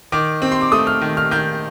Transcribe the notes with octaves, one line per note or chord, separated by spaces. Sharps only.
D#3 D6
C4
C6
D6
A3 D#6
F6
D#3
F6
D#3 G6